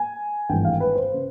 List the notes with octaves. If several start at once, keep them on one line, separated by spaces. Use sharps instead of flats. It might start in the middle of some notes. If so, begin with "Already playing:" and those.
Already playing: G#5
G#1 G2 E3 A3 G5
F5
B4
C5
C#3